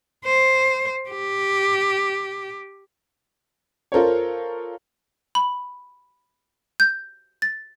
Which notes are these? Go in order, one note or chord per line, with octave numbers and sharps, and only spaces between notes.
C5
G4
F4 A4 A#4 C5 C#5
B5
G6
A6